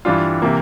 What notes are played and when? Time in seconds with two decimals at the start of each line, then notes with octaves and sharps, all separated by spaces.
0.05 G2 E3 G3 D4 F4
0.42 C3 E3 A#3